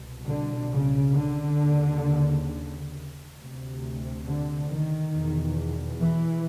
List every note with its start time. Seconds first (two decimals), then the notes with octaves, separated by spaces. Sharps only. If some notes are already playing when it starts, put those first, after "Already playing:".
Already playing: C2 B2
0.25 D3
0.70 C#3
1.13 D3
1.58 D#2 C#3
3.36 D2 C3
4.25 D3
4.69 D#3
5.13 E2 B2
6.01 E3